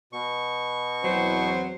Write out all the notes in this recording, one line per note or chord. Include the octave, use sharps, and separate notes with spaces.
B2 C#6
E2 F#3 C4 C5